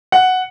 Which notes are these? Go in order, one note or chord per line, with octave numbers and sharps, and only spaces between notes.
F#5